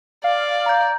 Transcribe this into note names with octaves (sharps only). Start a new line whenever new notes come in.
D5 F5
A#5 G6